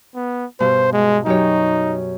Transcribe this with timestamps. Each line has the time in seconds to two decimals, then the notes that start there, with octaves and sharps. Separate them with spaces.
0.15 B3
0.60 G2 B2 C5
0.93 G#3
1.26 F#2 D#4 G4 C#5